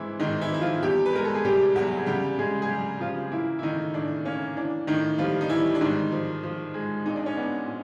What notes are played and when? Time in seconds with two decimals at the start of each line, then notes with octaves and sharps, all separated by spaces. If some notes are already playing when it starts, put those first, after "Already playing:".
Already playing: G#2 E3 C4 E4
0.20 G#2 D#3 D#4
0.41 E3 E4
0.51 F3
0.54 E4
0.61 F3 F4
0.82 E2 G3 G4
1.06 B4
1.14 G#3 A#4
1.25 A4
1.35 G#4
1.45 C3 G3 G4
1.75 E2 F#3 F#4
1.97 G#4
2.06 C#3 G3 G4
2.38 C#3 G#3 G#4
2.62 G#4
2.69 F#3 G3 G4
3.00 C#3 F3 F4
3.31 E3 A#3 E4
3.59 E4
3.63 A2 D#3 D#4
3.94 A2 D4
4.25 A#3 C#4
4.56 E3 D4
4.87 A2 D#3 D#4
5.18 F3 G3 F4
5.41 D#4
5.49 E3 G3 E4
5.75 D4
5.81 G#2 D#3 D#4
6.12 F3
6.43 F3
6.74 G#3
7.06 A#2 D#4
7.16 D4
7.26 C#4
7.36 B3 D4
7.67 A#2